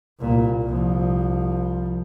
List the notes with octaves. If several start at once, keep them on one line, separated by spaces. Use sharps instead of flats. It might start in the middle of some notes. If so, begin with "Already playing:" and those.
C2 A#2
C2 F3